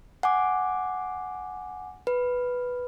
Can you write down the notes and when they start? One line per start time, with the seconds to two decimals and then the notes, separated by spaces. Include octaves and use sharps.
0.23 F#5 G#5 D6
2.07 B4